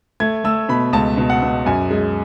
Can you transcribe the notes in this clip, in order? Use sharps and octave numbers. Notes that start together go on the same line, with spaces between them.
A3 G#6
A3 E6
B2 B5
C#2 A5
B2
F#5
B2
F#2 G#5
G#3